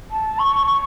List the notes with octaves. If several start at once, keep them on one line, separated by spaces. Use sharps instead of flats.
A5
C#6
C#6